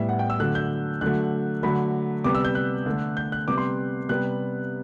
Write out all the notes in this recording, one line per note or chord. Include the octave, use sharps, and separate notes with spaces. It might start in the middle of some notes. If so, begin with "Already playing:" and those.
Already playing: A2 G3 B3 E5
F#5
G5
E6
D3 F#3 A3 F#6
G6
D3 F#3 A3 F#6
D3 F#3 A3 B5
C3 G3 B3 D6
E6
G6
F#6
D3 A3
G6
F#6
C3 G3 B3 D6
C6
C3 G3 B3 F#6